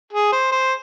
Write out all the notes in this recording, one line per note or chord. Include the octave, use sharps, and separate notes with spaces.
G#4
C5
C5